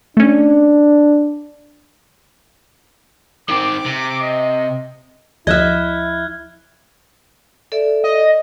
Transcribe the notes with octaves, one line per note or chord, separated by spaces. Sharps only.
A3 C#4 D4
D#3 C4 D6
C3
D#5
D2 F3 E4 D#5 E5 F6 F#6 G#6
A4 D5 E5
D#5